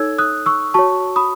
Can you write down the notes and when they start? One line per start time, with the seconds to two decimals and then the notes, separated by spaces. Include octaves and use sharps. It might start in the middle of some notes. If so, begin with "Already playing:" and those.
Already playing: D#4 A4 C#5 E6 G#6
0.18 D#6 F#6
0.46 C#6 E6
0.74 F#4 C#5 A5 C#6
1.16 B5 D#6